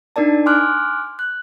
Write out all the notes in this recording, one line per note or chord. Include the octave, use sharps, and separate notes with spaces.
D4 D#4 A#4 D5 A5
G#5 C6 D6 F6 F#6
F#6